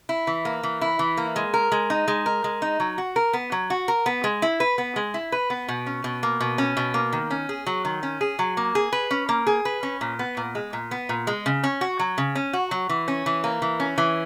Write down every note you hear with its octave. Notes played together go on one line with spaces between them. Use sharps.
E4
E3
A#3
E3
E4
E3
A#3
G#3
A#4
G#3
D#4
G#3
A#4
G#3
D#4
F#3
F#4
A#4
B3
F#3
F#4
A#4
B3
G#3
E4
B4
B3
G#3
E4
B4
B3
B2
C#4
B2
A#3
B2
C#4
B2
A#3
D#3
C#4
G#4
F#3
D#3
C#4
G#4
F#3
A#3
G#4
B4
C#4
A#3
G#4
B4
C#4
A#2
B3
A#2
G#3
A#2
B3
A#2
G#3
C#3
C#4
F#4
F#3
C#3
C#4
F#4
F#3
E3
C#4
E3
A#3
E3
C#4
E3